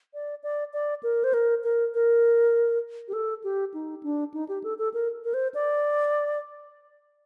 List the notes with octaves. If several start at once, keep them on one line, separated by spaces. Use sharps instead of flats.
D5
D5
D5
A#4
C5
A#4
A#4
A#4
G4
A4
G4
D#4
D4
D#4
G4
A4
A4
A#4
A#4
C5
D5